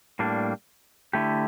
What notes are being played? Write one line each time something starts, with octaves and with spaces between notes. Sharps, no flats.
A2 G3 A#3 D4
D3 A3 E4 G4